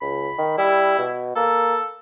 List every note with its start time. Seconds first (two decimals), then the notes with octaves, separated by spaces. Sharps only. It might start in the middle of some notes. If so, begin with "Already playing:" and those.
0.01 C#2 B5
0.38 D#3
0.58 G3 E4
0.98 B2
1.36 A#3 A4